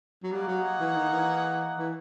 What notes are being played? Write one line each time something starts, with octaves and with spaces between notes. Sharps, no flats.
F#3
G3 A#3 D#4 G#4 C#5 F#5
F#3
E3
D#3
E3
E3